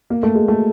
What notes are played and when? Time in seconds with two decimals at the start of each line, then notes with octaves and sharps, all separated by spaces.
0.10 A#3
0.23 A3
0.35 G#3
0.48 A3